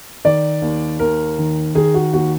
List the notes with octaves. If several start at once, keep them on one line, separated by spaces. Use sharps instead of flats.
D#3 D5
D#2
D#2 A#4
D#3
D#3 G#4
F#4
D#2 F#4